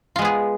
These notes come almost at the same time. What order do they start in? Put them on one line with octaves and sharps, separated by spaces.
F4 G#3 B3 G#4